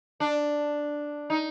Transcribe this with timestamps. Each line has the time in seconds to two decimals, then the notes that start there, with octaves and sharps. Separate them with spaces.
0.20 D4
1.30 D#4